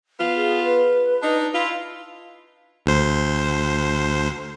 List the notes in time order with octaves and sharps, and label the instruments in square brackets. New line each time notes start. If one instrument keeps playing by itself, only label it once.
[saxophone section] B3 F4
[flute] G#4
B4
[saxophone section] D4 D#4
E4 F4
[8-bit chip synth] D2 C5